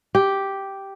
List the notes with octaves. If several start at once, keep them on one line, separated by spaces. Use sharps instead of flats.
G4